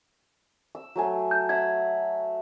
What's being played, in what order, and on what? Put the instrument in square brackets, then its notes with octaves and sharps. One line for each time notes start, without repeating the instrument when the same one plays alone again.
[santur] E6
F#3 A3 G#5
[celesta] G6
[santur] E5 F#5 [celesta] G#6